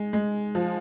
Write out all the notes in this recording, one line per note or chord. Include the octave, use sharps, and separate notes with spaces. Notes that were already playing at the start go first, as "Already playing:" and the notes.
Already playing: G#3
G#3
F3